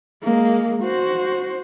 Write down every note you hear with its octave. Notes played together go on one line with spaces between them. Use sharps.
G#3 A#3
F#4 C5